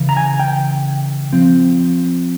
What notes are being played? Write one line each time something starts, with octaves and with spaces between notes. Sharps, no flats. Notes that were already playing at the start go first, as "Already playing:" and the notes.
Already playing: C#3 E3
A#5
G#5
G5
F3 C4